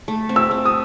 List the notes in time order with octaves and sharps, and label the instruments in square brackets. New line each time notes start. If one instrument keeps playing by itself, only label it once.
[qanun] A3
C4
[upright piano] E6
[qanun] A3
[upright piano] D#6